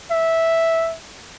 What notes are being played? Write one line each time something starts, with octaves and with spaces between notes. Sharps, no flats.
E5